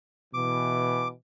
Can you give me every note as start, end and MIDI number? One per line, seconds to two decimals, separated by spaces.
0.34 1.12 47
0.34 1.12 52
0.34 1.08 86